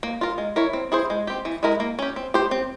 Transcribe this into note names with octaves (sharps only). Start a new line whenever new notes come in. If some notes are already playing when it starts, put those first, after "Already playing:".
A#3
F4 A#4
G#3
E4 A#4 C#5
C4
E4 G#4 C5
G#3
C4 G4
E3
G#3 E4 A#4
A#3
C#4 G4
C4
G4 C5
C4